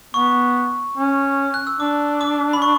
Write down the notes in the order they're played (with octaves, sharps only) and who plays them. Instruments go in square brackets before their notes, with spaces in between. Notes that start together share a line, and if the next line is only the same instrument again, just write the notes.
[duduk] B3 [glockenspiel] C#6
[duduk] C#4
[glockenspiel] F#6
E6
[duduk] D4 [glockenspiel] D6
[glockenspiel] D6
B5
C#6